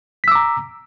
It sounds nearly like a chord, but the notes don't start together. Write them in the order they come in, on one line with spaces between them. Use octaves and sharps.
B6 E6 D6 A#5